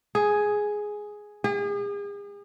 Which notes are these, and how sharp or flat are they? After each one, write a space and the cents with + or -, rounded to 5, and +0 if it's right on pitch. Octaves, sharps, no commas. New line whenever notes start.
G#4 +5
G#4 -40